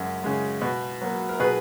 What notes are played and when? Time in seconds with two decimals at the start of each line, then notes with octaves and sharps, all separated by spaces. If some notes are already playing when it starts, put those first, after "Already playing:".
Already playing: F#2 C#3 G#3
0.24 C#3 G#3
0.62 B2
1.01 F#3 A#3
1.29 A#4
1.40 B2 G#4 B4